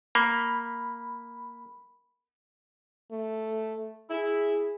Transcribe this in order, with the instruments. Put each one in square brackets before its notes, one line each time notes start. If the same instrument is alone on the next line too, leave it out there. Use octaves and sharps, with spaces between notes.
[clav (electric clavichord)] A#3 [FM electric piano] B5
[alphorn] A3
[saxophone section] E4 [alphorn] G#4